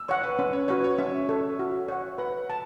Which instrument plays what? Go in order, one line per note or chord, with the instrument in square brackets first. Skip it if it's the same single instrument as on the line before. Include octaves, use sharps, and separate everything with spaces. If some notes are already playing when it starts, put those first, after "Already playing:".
Already playing: [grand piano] E6
[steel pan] C#5 F#5 [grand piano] C#6
[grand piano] B4
[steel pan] C#4 [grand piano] B4
[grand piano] C#5
[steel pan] F#4 C#5 [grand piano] B4
[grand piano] C#5
[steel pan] C#4 [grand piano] E5
[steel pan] A4 C#5
F#4
C#5 F#5
[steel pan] B4 [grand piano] F#5
[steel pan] A5